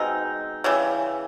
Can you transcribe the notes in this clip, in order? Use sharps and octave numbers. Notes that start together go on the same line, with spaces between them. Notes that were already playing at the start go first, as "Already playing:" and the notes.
Already playing: B2 G#3 C4 D#4
C#3 E3 G3